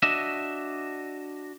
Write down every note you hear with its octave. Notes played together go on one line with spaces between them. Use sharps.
D4 F#4 D#5 E5